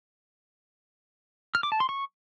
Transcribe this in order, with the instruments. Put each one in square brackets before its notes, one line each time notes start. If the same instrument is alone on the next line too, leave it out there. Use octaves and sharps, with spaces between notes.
[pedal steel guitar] F6
D6
A5
C6
C#6